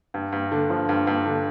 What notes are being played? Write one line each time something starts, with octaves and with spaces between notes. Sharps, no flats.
G2
G2
D3
F3
G2
G2
D3